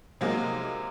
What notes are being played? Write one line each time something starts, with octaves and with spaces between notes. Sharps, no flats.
C3 F#3 G#3 A#3 D#4 G#4